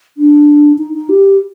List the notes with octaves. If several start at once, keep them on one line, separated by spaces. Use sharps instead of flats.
D4
D#4
D#4
G4